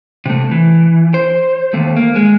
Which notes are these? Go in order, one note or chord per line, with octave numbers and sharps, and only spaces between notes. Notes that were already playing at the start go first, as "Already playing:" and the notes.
C3 A3
E3
C5
D#2 A3
A#3
G#3